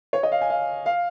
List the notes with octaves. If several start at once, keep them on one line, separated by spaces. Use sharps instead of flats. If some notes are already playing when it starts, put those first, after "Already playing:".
C#5
D#5
F5
G#5
F5
F5